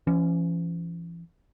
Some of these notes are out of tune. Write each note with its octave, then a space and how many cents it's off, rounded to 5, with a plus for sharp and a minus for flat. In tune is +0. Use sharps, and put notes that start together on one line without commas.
E3 +45 C#4 +0